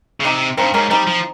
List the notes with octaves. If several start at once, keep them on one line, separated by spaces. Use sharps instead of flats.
C#3
C3 D#4 G4
G2 C4 D#4
G#2 A#3 C#4
G3 C4 D#4
F3